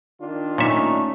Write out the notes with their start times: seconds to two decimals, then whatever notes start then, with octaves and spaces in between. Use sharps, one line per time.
0.20 D#3 D4 F4
0.58 A#2 A3 C#4 D#4 E5